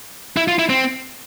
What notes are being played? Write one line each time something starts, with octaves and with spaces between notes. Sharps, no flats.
E4
F4
E4
C4